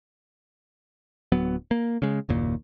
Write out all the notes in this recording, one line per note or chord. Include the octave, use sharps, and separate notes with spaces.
D1 F#3 B3
A#3
C#3 G#3
F#1 D#2 A#2